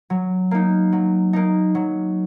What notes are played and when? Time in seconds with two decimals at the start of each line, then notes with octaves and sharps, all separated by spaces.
0.10 F#3
0.51 A#3 D#4
0.92 F#3
1.33 A#3 D#4
1.75 F#3